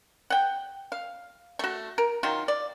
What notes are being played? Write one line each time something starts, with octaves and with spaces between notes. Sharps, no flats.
F#5 G5
F5
A3 F#4
A#4
D#3 F#3 F4
D5